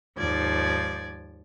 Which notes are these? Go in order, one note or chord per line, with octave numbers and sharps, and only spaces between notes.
D#2 G#2 F3 D5 G#6